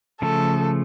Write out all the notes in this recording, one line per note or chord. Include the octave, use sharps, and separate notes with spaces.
C#3 F3 A3 A4